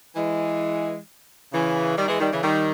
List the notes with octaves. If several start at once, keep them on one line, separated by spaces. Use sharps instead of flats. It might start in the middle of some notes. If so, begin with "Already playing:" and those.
E3 G#3
C#3 E3
D#3 G3
E3 G#3
D#3 G3
C#3 E3
D#3 G3